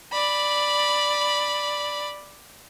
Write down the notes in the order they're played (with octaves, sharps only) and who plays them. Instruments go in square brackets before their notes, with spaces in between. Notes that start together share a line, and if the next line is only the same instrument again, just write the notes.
[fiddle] D5 B5